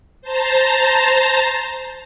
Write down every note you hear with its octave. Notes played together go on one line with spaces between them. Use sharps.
C5 A5 A#5